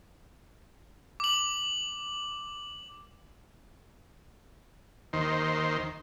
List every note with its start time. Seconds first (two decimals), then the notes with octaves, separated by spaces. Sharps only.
1.20 D6 F#7
5.13 D#2 D#3 C5